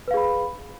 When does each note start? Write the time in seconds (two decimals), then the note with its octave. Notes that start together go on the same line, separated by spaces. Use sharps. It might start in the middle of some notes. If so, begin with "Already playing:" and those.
0.08 B4
0.11 F5
0.14 G#4
0.17 B5